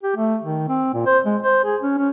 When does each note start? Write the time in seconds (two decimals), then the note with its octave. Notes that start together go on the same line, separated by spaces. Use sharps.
0.03 G4
0.16 A3
0.43 D#3
0.68 C4
0.93 A#2
1.06 C5
1.26 G#3
1.43 C5
1.64 G#4
1.82 C#4
1.98 C#4